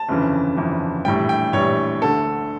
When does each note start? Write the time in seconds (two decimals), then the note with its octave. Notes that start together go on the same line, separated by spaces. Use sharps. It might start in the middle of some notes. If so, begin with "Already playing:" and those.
Already playing: A5
0.09 G1 F2 C#3 E3
0.57 G1 F2 C#3 E3
1.05 A#1 A2 E3 G3 G5
1.29 G5
1.53 A#1 A2 E3 G3 C#5
2.01 D2 D3 A3 A4